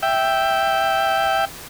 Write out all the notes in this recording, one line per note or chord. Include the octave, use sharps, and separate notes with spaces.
E5 G5